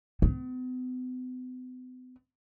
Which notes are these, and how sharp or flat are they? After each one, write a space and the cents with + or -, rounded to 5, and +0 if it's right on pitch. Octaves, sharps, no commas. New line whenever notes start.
B3 +45